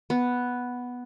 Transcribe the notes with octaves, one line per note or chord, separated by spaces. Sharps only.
B3